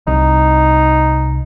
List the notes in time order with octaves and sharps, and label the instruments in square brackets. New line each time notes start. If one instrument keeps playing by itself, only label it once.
[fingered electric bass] C2 [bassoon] D#4